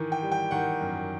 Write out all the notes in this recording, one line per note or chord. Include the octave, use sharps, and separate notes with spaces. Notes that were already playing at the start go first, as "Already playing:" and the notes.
Already playing: D#3 E3
G5
G3
G5
D#3 F#5
F#2